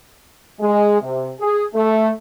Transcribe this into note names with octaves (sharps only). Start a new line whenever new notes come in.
G#3
C3
G#4
A3